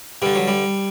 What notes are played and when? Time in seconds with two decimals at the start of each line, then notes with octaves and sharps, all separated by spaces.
0.22 G2 D3 G3
0.35 F#3
0.48 G3